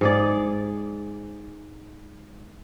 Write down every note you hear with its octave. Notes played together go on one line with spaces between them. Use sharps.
G#2 G#4 D5